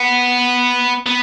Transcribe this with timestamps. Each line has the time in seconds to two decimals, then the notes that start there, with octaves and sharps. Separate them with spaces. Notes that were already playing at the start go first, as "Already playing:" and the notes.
Already playing: B3
1.06 B3